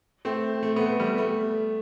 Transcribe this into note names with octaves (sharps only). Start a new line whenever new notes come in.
A3 C4
A3
B3
A3
G3 B3
A3